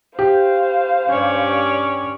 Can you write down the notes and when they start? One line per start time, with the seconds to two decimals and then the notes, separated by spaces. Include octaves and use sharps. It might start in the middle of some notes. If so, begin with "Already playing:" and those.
0.19 G4 C5 F5
1.09 G2 C#4 C#5 D5